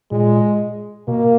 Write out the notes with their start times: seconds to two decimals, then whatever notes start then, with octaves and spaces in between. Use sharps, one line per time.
0.11 A#2 G#3
1.08 B2 A#3